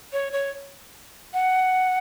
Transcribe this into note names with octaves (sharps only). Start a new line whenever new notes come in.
C#5
C#5
F#5